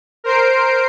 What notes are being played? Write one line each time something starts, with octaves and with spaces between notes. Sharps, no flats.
A#4 C5 C7 D7